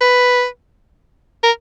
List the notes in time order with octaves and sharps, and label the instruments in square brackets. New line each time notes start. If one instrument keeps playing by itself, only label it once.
[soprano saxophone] B4
A#4